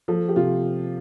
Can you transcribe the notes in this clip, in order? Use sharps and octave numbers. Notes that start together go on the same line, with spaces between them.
F3 A4
G4
C3 F4